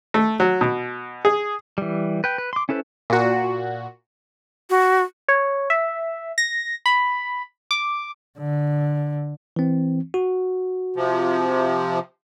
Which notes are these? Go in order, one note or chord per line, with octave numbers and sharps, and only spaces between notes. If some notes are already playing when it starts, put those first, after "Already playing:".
A3
F#3
B2
G#4
E3 G3
B4 G5
B4
C6 D6
C#4 E4 A4 B4 C5
A#2 F#4
F#4
C#5
E5
A#6
B5
D6
D3
E3 C4
F#4
C3 F3